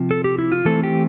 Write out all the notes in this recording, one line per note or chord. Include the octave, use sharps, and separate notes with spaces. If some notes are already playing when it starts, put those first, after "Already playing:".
Already playing: C3 F3 C4
A4
G4
E4
F4
E3 A3 C4 A4
G4